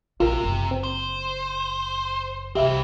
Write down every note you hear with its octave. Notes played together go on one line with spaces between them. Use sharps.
A#1 C3 F4 A#4
F#1 D4
C4
C5
C2 E3 C4 G4 E5 F5